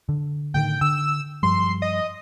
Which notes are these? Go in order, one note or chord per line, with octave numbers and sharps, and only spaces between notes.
D3
A2 D3 D#3 G5
D3 E6
G2 F3 G3 C6
D#5